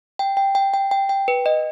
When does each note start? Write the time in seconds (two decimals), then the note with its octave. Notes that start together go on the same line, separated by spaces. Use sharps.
0.19 G5
0.37 G5
0.55 G5
0.74 G5
0.91 G5
1.09 G5
1.28 B4
1.46 D#5